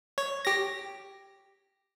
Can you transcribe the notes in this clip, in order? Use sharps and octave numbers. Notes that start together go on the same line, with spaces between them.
C#5
G4 A#6